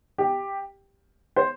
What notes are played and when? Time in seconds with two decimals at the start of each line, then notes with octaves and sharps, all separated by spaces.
0.18 G4
1.36 C5